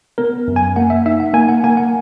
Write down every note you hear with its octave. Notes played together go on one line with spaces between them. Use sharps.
B3 A#4
F#2
G#5
A#3 F#5
E5
D#4 E5
F#5
A#3 G#5
F#5
A#3 G#5
F#5